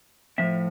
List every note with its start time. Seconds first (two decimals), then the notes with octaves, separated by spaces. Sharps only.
0.38 A2 F3 C4 E5